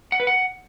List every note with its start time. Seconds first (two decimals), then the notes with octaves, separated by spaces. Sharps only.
0.12 F#5
0.20 B4
0.27 F#5